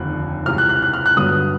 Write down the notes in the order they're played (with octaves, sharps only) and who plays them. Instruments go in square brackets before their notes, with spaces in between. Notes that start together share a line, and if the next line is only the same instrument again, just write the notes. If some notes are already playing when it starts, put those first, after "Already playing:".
Already playing: [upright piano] F1 D#2 D3 F3 [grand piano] F#6
[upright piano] C#2 C3 E3 [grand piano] F6
[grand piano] F#6
F#6
F#6
F6
F#6
[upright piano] G1 G2 D3 F#3 B3 [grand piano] D#6